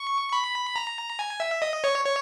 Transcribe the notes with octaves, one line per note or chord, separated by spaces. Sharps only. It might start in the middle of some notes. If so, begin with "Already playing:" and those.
Already playing: C#6
B5
A#5
G#5
E5
D#5
C#5
C#5